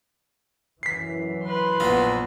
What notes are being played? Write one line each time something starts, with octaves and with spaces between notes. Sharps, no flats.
F#2 E3 B6 C7
B4 C6
A#1 B3 F4